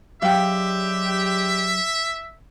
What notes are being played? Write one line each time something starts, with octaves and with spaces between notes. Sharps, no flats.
F#3 G#3 D4 G4 E5 F5 G5